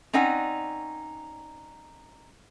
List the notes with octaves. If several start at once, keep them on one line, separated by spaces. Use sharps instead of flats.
C4 C#4 D#4 D5 F#5